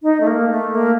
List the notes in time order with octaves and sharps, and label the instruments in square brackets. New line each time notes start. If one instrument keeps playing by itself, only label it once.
[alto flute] D#4
A3
A#3
A3
A#3